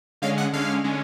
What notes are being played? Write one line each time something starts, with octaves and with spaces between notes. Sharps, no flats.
D3 G#3 C#4 F5
F#5
D3 G#3 C#4 F5
D3 G#3 C#4